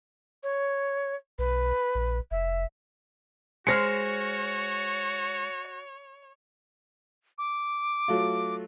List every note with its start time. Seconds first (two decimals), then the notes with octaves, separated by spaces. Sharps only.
0.43 C#5
1.39 B1 B4
1.95 A#1
2.31 F1 E5
3.67 G#3 F#4 C5 C#5 F6 A#6 C#7
7.38 D6
8.08 F#3 A3 F4